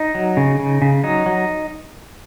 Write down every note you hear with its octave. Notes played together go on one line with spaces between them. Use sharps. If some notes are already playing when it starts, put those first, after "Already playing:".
Already playing: D#4
F#3
C#3
C#3
C#3
F#3 D#4
F#3